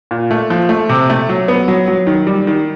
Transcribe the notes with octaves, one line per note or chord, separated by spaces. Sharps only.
A#2
A3
F3
A3
C3
A3
F#3
B3
F#3
F#3
D#3
G3
D#3